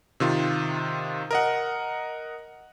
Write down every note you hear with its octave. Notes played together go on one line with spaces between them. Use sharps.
C3 D#3 F4
A#4 D#5 F#5